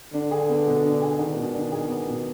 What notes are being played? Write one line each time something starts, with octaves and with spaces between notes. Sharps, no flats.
D3 D4
G#4
B3
B2
D4
G#4
D#3 B3
B2
D4
G#4
B3
B2